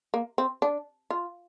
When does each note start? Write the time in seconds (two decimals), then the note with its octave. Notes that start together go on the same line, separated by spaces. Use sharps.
0.14 A#3
0.38 C4
0.62 D4
1.10 F4